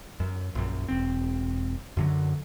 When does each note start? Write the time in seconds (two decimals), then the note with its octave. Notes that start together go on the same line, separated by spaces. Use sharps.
0.20 F#2
0.55 A#1 F#2
0.88 E1 C4
1.97 F#2 D3 F#3